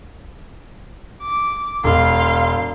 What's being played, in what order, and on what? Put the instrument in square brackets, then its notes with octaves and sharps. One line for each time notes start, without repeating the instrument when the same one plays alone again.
[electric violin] D6
[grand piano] E1 [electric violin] F5 C6